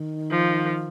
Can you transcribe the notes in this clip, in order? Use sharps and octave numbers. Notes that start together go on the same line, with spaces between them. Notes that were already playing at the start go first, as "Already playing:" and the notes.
Already playing: D#3
F3